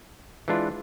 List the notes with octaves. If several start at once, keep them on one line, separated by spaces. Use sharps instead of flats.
E3 G#3 D4 F4 B4